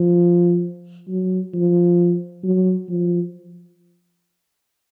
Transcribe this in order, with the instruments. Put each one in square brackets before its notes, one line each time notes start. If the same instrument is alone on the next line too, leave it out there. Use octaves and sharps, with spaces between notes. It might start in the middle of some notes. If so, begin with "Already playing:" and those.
Already playing: [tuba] F3
F#3
F3
F#3
F3